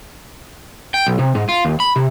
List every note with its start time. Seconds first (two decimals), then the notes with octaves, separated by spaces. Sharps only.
0.94 G5
1.07 B1
1.19 C3
1.35 G#2
1.49 F4
1.65 D#2
1.80 B5
1.96 C3